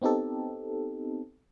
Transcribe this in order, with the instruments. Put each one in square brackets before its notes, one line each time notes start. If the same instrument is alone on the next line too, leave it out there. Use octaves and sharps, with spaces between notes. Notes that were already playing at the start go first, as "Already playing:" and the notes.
[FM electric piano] B3 C4 D#4 G4 A4